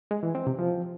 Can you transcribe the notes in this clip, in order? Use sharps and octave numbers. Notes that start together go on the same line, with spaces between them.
G#3
E3
C4
C3
F3